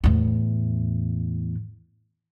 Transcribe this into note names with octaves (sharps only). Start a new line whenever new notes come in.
E2 A2